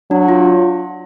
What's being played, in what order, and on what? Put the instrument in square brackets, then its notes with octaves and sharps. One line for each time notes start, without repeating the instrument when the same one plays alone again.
[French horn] F#3 [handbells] D4
[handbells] F4